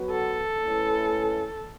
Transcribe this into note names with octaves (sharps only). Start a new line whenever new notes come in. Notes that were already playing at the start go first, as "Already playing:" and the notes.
Already playing: F#3 B3 F#4 B4
A4
A3 C#4 E4 B4